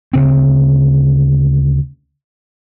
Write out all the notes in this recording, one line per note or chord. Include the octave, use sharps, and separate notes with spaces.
D2 C#3 C4